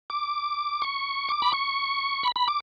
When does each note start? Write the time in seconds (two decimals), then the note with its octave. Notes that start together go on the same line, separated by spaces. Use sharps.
0.10 D6
0.82 C#6
1.29 D6
1.42 B5
1.53 C#6
2.23 B5
2.36 B5
2.48 D6